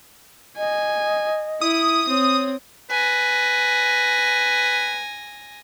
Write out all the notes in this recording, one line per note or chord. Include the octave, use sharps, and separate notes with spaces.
D#5 G#5
E4 D#6
C4 C#5
B4 G#5 A#6